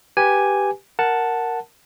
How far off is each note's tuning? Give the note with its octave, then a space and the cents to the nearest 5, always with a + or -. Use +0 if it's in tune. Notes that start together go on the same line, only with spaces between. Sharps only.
G4 +0 B4 +0 G#5 +0
A#4 +0 F#5 +0 A5 +0